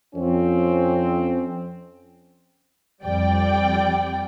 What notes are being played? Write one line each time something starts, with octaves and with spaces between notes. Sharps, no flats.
F2 C4 C#4
F2 G3 D5 G5